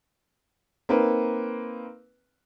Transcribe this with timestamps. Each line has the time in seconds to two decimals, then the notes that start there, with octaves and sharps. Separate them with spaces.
0.89 A#3 C4 D#4 B4